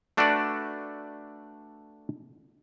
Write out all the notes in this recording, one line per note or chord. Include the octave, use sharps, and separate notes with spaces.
A3 D4 F#4 A4 B4 D5